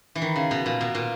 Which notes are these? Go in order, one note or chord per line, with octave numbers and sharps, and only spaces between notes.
E3
D#3
C#3
B2
A#2
B2
A#2